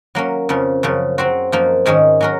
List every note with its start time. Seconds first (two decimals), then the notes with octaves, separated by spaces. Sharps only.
0.15 F#3 A#3 C#4
0.49 F2 C#3 F3
0.83 F#2 C#3 F3
1.18 F#3 C4 F#4 C5
1.52 F#2 F3 A#3 D#4
1.86 G#2 D#3 G#3 C#4 G#4
2.21 F#3 C#4 F#4 A#4